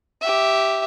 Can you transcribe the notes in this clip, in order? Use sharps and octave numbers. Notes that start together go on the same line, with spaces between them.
G4 E5